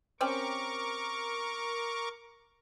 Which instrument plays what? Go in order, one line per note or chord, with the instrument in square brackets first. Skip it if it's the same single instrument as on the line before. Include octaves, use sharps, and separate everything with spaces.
[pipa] C4 C#4 G4 [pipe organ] A#4 C#6 D6